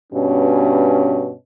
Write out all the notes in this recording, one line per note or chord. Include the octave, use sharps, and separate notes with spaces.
G2 B2 C#4